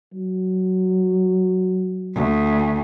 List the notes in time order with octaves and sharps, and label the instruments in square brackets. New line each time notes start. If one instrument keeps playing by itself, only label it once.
[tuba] F#3
[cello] D2